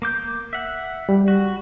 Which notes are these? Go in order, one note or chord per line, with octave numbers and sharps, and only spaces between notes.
A#3 D6 G6
E5 F#5
G3
F#4